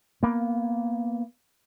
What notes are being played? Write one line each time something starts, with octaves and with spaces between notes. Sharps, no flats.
A#3 B3